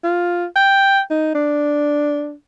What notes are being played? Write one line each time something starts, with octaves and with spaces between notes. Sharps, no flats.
F4
G5
D#4
D4